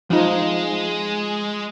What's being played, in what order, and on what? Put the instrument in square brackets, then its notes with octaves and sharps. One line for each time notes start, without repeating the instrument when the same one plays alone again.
[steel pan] F3 D#4 [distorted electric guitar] G#3